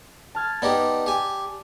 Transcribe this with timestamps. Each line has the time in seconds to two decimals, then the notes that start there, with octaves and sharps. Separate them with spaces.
0.35 A5 F6 G#6
0.62 B3 D#4 G4 D5
1.06 G4 G#5